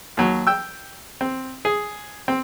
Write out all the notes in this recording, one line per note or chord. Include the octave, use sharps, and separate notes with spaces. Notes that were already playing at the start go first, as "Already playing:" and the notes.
D#2 F#3
G5 E6
C4
G#4
C4